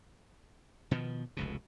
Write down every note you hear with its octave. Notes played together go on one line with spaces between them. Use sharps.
B2 D#3 F3
F1 C#2 B2